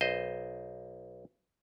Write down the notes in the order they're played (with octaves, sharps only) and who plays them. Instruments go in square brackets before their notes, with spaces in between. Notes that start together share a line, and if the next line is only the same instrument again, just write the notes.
[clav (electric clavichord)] B1 C5 D#5